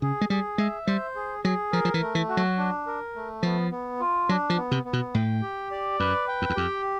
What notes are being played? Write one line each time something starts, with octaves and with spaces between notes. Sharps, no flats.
C#3 G#4
G#3
G3 G#4
G#3 E5
G3 C5
G#4
F#3 G#4
F3 A#4
F3
E3
A3
E3
F#4
F#3
D4
A#4
A3
F3 B3
B3
F4
F#3 D4
F3
B3
C3
B3
B2
A2 G5
G4
D5
F#2 B4
G5
F2
E2
F2 G4